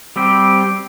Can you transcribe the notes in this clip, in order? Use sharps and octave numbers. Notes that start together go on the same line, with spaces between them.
G3 C4 G4